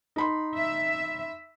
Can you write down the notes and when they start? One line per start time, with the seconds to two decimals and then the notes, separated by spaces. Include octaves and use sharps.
0.16 D#4 B5 C6
0.58 E5